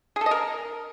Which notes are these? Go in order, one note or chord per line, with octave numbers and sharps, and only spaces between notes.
G#4
A4
D#5
A#4